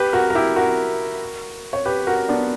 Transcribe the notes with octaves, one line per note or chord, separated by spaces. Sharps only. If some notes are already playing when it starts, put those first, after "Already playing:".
Already playing: G4 B4
F#4 A#4
A#4
E4 G4
F#4 A#4
C#5
G4 B4
F#4 A#4
B3 D4